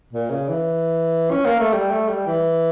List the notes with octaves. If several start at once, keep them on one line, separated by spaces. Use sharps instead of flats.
A#2
C#3
E3
C#4
A#3
A3
G3
A3
G3
E3